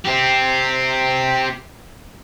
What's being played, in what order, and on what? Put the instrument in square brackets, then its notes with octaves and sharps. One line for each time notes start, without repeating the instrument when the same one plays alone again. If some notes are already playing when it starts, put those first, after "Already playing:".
[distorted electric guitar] C4 G4